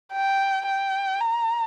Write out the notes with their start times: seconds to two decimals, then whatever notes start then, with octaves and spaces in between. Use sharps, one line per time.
0.13 G5
0.66 G5
1.21 A#5